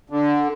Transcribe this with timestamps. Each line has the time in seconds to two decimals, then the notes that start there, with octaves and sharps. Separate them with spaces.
0.10 D3